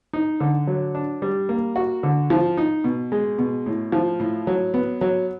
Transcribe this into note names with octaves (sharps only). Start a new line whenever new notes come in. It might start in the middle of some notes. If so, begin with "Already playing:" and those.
D#4
D3
F#3
D4
G3
A#3
F#4
D3
F3
D#4
B2
G#3
B2
A2
F3
A2
F#3
B3
F#3